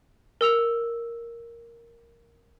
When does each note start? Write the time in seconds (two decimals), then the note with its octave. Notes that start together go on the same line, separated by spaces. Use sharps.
0.41 A#4 E6 F7